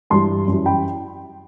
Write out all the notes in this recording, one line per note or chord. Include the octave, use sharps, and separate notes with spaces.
G2 E3 G3 A5 C6
F#2 E3 G3
G5 B5